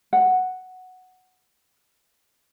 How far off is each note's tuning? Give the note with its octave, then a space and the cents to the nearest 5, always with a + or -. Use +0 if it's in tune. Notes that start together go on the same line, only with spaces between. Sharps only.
F#5 +0